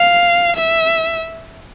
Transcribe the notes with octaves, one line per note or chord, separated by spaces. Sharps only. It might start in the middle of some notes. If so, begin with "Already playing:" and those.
Already playing: F5
E5